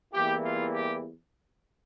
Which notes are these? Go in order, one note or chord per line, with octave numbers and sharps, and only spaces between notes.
E2 E3 G3 A#3 E4 G4
F4
G4